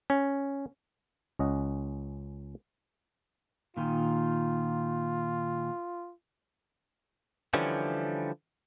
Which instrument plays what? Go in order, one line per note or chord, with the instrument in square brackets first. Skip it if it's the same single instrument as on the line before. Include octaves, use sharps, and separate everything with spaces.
[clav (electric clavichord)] C#4
C#2 C#4 D#5 F#5
[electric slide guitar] A#2 D#3 [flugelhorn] F4
[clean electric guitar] D3 E3 F3 G3 C#4